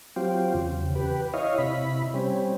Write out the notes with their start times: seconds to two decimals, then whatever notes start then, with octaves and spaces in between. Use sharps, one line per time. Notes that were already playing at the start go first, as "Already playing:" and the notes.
0.16 F#3 C4 F4 G4
0.54 E2 C#3
0.95 G4 B4
1.34 E4 C#5 D#5 F5
1.58 C3 E4 B5
2.14 G3 C4 C#4